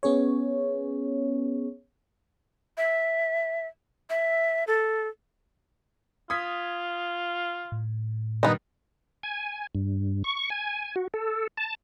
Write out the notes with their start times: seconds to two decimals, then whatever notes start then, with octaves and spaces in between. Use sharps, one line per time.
0.03 B3 C#4 G#4 C#5
2.77 E5
4.10 E5
4.67 A4
6.30 F4 D#6 G#6 B6
7.72 A2
8.43 G2 A#2 D#3 B3 D#4
9.23 G#5
9.75 G2
10.24 C#6
10.50 G#5
10.96 F#4
11.14 A4
11.57 A5